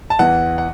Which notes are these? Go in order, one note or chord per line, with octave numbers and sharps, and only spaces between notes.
A5
E2 E3 F#5
F#5